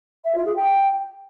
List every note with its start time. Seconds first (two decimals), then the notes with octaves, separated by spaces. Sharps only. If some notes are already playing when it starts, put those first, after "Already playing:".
0.24 E5
0.35 F4
0.45 G#4
0.56 G5